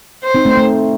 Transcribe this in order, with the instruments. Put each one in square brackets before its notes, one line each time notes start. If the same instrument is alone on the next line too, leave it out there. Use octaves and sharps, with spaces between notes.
[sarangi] C5
[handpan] C4 D#4
A3 C4
A3